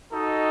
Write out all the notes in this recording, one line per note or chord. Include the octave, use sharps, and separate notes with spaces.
D#4 F#4 A4 D#5